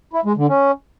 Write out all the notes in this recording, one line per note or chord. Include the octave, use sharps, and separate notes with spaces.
E4
G#3
D3
C#4